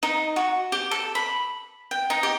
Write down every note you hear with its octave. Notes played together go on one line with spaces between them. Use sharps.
D#4
F#4
G4
A4
B5
G5
D#4
G4